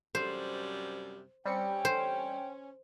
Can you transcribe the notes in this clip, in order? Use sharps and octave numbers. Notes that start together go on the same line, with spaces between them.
F#2 C3 G3 C5
G3 C4 C#4 G5 C#7
C5